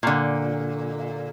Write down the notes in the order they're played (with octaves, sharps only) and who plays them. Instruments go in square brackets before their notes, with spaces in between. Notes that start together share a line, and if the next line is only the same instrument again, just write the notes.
[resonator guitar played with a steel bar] A#2 D3